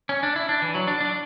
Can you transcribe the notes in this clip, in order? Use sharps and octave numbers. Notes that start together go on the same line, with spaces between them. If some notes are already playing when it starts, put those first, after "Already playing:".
C#4
D4
E4
D4
E3
F#3
D4
D4